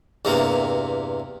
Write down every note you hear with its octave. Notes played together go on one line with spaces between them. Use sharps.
E2 G2 C3 A#3